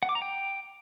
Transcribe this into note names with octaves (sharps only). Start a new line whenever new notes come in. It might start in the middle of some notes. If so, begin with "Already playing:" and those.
F#5
D6
A#5
G5